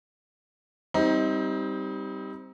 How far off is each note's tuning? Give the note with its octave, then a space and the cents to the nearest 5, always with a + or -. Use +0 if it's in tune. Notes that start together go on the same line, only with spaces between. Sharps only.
G3 +0 C4 +0 D#4 +25